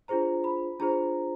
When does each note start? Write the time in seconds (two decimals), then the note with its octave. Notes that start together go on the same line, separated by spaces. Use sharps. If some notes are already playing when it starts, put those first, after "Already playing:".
0.08 D4 F4 G#4 C5 A#5
0.44 B5
0.80 D4 F4 G#4 C5 A#5